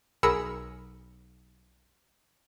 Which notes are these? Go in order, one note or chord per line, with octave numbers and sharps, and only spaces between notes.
B1 G#4 A#4 B5 E6 C#7